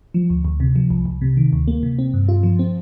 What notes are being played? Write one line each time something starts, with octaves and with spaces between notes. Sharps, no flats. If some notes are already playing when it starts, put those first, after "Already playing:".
F3
D2
D2
C3
F3
C2
C2
C3
D#3
D2
A#3
C3
C4
G2
F4
F3
C4